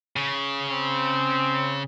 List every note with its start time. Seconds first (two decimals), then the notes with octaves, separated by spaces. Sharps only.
0.16 C#3
0.70 C4